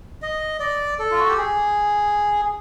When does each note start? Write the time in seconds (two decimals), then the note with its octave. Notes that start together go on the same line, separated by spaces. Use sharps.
0.22 D#5
0.60 D5
0.99 A4
1.11 F4
1.19 F#4
1.29 G4
1.37 G#4